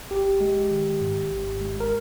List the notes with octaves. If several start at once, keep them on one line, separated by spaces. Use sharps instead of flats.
G#1 G4
G#3
D#3
G#2
G#1
G#3
A#4